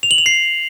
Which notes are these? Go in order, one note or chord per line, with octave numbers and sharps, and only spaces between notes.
F7
F#7
F7
C7